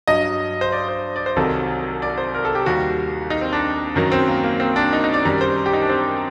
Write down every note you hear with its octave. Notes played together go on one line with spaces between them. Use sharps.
G2 F#3 D#5
C5
D5
C5
D5
C5
C2 C3 D#3 F#3 A4
D5
C5
A#4
A4
G4
D#2 D#3 G3 F#4
D#4
C4
D4
F#2 D#3 F#3
C4
A#3
A#3
C4
D4
D#4
D#4
D5
F#2 D#3 G3 D5
C5
G4
D#4
D4
C4